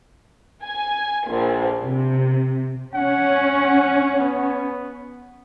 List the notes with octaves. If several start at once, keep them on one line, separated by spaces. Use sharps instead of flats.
G#5
A#1
C3
C#4 F#5
B3